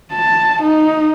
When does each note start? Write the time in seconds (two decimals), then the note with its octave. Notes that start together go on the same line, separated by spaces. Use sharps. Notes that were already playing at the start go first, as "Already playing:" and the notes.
0.13 A5
0.63 D#4